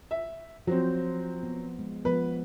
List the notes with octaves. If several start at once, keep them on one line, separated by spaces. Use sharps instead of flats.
E5
F3 F#3 C4 C5
B3
G#3
F3 B3 B4